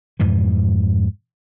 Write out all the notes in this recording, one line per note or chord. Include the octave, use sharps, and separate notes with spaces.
F2 G#2 B2 E3